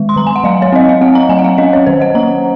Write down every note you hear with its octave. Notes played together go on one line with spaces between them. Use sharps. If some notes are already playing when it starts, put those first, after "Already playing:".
Already playing: D#3 G#3
C6
D#3 A#5
G#5
F#5
F#3 F5
C#5
C4 D#5
F5
C4 F#5
A#5
F#3 G#5
F#5
F5
C#4 D#5
C#5
D#3 C5
F#5
A#3 A#5